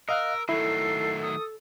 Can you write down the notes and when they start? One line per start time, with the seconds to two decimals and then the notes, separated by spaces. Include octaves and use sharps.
0.09 A#4 D#5 F5 E6 F#6
0.49 D#3 F#3 A3 E4 A4 C7
1.22 D#6